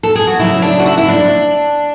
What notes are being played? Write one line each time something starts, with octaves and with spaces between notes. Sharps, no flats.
A4
G#4
F#4
C#3 F#3 A3 E4
D4
F#4
E4
E4
D4